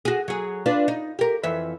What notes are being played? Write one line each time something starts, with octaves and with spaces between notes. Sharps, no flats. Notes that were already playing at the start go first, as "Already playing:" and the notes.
F#4 G#4
F#3 G#4
D4 F4 B4
D#4
G4 A#4
F2 E3 E5